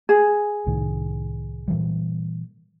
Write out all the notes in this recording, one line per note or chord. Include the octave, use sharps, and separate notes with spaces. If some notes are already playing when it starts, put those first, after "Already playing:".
G#4
C2 A2 D#3
A#2 E3 G3